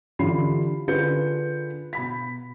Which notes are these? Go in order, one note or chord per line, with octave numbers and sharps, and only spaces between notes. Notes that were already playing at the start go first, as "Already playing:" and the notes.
D3 E3 F4 G4 B5 C7
D3 F4 G#4 B4 G6 C#7
B2 B5 B6